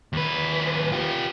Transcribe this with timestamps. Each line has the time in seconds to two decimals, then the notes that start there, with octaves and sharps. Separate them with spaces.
0.13 D#2 B4
0.92 F4 G4